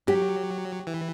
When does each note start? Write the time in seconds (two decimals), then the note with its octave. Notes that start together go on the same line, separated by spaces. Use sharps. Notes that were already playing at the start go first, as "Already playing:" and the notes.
0.07 F#3 G4
0.87 E3